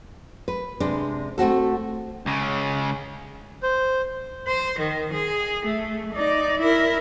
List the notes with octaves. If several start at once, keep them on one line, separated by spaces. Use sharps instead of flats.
B4
C3 G#3 D4
A3 C4 F#4 A4
C#2 C#3
C5
C5
D#3
G#4
A3
D#4 D5
E4 A#4